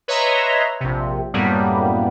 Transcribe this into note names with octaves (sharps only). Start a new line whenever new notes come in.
B4 C#5 D#5 E5 A#5 C6
A#1 C3
F#2 A2 G3 A#3 B3